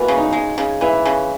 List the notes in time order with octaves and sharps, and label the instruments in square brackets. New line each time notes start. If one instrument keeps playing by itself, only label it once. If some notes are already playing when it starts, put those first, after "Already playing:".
Already playing: [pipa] E3 [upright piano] A#3 B3 F#4
[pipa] C#3
[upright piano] D#4
[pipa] G#3
C#3
[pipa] E3 [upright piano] E4
[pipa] C#3